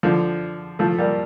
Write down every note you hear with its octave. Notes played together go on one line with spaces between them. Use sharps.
D3 F3
F3 A3
G3 A#3